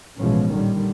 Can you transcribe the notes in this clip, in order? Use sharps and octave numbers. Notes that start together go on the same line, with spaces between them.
A1 B2 E3 F3 G#3 C#4
A#2 D3 D#3 G3